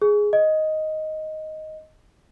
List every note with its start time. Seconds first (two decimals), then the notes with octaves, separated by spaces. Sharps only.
0.02 G#4
0.33 D#5